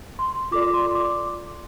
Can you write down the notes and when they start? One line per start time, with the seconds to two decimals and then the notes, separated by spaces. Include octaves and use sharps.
0.19 C6
0.51 F4 A4 D5 D6
0.74 C6
0.95 D6